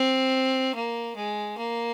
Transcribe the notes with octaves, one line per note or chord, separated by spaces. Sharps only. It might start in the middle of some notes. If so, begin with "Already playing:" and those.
Already playing: C4
A#3
G#3
A#3